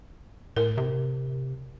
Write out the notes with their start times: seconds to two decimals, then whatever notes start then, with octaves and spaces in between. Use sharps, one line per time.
0.56 A2 A#4
0.78 C3